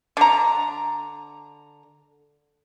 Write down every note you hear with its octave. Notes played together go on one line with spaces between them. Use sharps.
D3 A#5